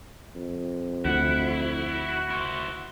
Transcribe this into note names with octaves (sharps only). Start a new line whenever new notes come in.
F2
D2 E4 F#5
F#4
E4 C5